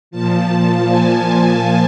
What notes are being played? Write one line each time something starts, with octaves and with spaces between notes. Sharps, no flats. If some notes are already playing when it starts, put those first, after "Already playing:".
A#2 F3 A5
A5
G#5
G#5